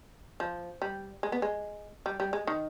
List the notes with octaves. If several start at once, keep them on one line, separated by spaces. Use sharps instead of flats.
F3
G3
G#3
B3
G#3
G3
G3
G#3
D#3